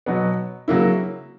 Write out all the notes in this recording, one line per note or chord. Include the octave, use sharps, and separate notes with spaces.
B2 F#3 B3
C#3 F#3 A#3 E4